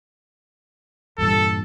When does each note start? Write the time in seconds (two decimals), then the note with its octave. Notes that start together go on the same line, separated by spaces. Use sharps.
1.18 E2 G2 A#2 A4